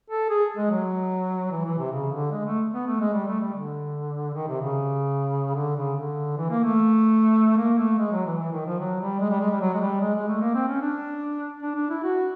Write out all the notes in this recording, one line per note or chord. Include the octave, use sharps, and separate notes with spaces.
A4
G#4
G#3
F#3
E3
E3
C3
C#3
D3
G#3
A3
B3
A3
G#3
G3
A3
G3
D3
D#3
C3
C#3
D3
C#3
D3
E3
A#3
A3
A#3
A3
G#3
F#3
E3
E3
D#3
F3
F#3
G3
G#3
G3
G#3
G3
F#3
G#3
G3
G#3
G#3
A3
A#3
C4
C#4
D4
D4
D4
E4
F#4